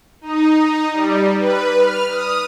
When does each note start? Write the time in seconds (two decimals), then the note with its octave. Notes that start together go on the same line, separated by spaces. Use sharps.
0.21 D#4
0.92 G3
1.38 B4
1.78 F6
2.10 D#6